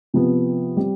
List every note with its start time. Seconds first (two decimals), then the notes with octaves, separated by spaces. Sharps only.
0.14 C3 F3 B3
0.77 G3 C4